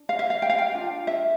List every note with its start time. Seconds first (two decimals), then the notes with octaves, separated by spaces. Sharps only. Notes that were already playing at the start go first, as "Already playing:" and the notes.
Already playing: D4
0.09 F5
0.19 E5
0.30 F5
0.42 G5
0.50 F5
0.59 G5
0.75 D4 F4
1.07 E5